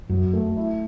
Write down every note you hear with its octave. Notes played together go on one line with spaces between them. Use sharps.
F#2 F#3
A3
E4